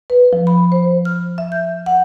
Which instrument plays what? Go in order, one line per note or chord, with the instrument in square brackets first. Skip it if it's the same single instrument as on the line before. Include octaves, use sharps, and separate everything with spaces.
[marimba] B4
F3
B5
C5
F6
E5
G6
F#5